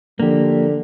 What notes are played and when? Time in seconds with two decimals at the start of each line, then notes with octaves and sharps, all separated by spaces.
0.20 D3 F3 A#3 G4